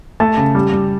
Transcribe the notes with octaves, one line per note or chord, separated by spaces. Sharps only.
A3 A5
C#3
G3
G3